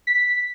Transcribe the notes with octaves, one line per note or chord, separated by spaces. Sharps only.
B6